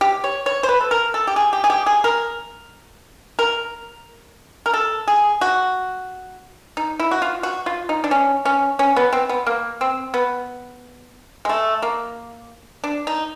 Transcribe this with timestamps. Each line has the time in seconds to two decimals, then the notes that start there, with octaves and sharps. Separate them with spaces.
0.01 G4
0.24 C#5
0.46 C#5
0.63 C5
0.69 B4
0.81 A4
0.91 A#4
1.14 A4
1.27 G4
1.36 G#4
1.53 G4
1.64 G#4
1.70 G4
1.86 G#4
2.04 A#4
3.39 A#4
4.66 A#4
4.73 A4
5.08 G#4
5.41 F#4
6.77 D#4
6.99 E4
7.11 F#4
7.22 F4
7.43 F#4
7.66 F4
7.89 D#4
8.04 D4
8.11 C#4
8.45 C#4
8.79 C#4
8.96 B3
9.13 C4
9.29 B3
9.47 A#3
9.81 C4
10.14 B3
11.45 G#3
11.49 A3
11.82 A#3
12.84 D4
13.07 D#4